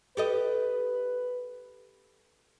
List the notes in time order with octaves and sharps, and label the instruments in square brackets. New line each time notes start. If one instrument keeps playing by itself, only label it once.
[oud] G4 A4 D#5 [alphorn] B4